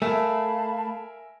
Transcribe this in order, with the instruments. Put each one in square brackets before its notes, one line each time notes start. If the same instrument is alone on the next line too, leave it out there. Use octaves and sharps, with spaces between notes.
[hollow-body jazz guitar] A3 [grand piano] A#4 E5 G#5 [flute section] F5 A5 B5